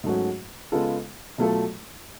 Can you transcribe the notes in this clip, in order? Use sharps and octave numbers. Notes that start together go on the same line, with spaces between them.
G#2 F#3 A3 C#4 F#4
C#3 G#3 B3 F4 A4
B2 F#3 A3 F4 A4